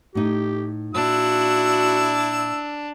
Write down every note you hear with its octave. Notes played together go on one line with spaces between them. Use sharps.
A2 D#4 G4
A#2 D4 E4 F#4 E6